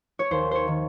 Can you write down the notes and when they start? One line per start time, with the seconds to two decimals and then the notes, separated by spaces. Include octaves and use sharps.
0.19 C#5
0.31 D#2 C5
0.51 C5 C#5
0.68 D#3